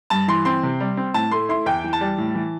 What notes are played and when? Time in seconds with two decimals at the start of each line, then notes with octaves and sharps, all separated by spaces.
0.10 G2 A5
0.28 E3 C6
0.45 C4 C6
0.63 C3
0.80 G3
0.97 C4
1.14 A2 A5
1.31 A3 C6
1.49 E4 C6
1.66 E2 G5
1.84 E3
1.93 A5
2.01 G3
2.18 A2
2.35 E3